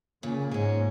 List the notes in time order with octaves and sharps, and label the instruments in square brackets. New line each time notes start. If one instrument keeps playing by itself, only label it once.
[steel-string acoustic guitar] A#2 [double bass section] C#3
[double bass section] G#2 [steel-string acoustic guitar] G#3 C#4